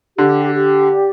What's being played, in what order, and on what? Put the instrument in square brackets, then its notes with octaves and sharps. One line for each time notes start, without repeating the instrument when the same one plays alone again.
[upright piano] D3 [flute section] G4
[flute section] G4
D5